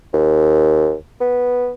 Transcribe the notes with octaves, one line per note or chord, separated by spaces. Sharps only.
D#2
B3